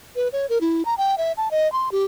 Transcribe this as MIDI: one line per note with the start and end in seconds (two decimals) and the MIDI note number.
0.16 0.28 71
0.33 0.46 73
0.49 0.59 70
0.61 0.83 64
0.85 0.95 82
0.98 1.18 79
1.18 1.32 76
1.37 1.49 81
1.51 1.71 75
1.72 1.89 84
1.92 2.05 67